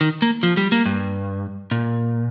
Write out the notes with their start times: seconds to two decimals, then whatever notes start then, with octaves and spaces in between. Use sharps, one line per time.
0.01 D#3
0.22 A#3
0.43 F3
0.57 G3
0.72 A#3
0.86 G2
1.71 A#2